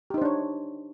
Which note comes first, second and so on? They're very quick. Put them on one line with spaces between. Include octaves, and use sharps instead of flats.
G4 D#4 C5 D4 C#5